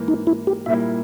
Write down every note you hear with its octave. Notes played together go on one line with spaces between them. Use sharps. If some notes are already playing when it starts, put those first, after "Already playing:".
Already playing: G#2 E3 A#3
D#4
E4
G4
A#2 G3 A#3 E4 E5